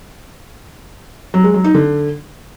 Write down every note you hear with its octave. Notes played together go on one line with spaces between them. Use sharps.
F#3
G#3
F#3
D#4
D3